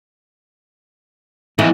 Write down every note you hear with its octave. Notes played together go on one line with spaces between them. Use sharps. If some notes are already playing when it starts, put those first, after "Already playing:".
B1 F2 E3